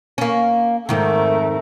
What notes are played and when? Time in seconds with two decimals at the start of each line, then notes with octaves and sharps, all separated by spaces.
0.18 A#3 C#4
0.89 F2 G#2 D#3 A3 A#4